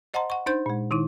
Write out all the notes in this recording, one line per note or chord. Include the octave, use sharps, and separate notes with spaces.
C5 D#5 F#5 A5 A#5 C6
F#5 C#6
D4 D#4 C5 G6
A#2 G#3
D#3 D#4 E4